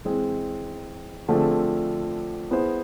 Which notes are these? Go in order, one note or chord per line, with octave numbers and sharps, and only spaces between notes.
E3 G#3 C4 G#4
D3 F3 A3 C4 G#4
B3 E4 G#4 C5